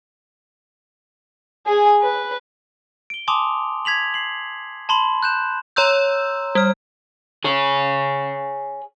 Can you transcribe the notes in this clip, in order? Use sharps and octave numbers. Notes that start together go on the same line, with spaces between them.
G#4 G#5
B4
D7 G7
G#5 A5 C6 D6 D#6 F7
G#6 B6 F7 F#7
C7 F#7
A5 B5 C6 F#7
F#6 G6 E7
C#5 A#5 C6 E6 G6
G3 F6
G#4 C#5